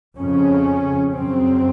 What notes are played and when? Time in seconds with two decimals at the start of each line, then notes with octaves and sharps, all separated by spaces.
0.17 F2 C#3 C#4
1.14 F#2 C#3 C4